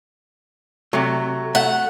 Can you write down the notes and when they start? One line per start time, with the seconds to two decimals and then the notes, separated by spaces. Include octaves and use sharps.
0.93 C3 F#3 A3
1.55 A3 F#5